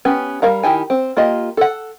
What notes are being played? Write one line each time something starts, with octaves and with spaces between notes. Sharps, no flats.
B3 C#4 G4
G3 A#4 F5 A#5
D#3 E4 G4 G#5
C4
A#3 F4 G4 D#5
A4 F#5